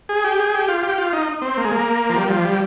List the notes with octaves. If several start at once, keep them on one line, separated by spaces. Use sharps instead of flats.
G#4
G4
G#4
G4
F4
G4
F4
D#4
C4
A#3
G#3
A#3
F3
G3
F3
G3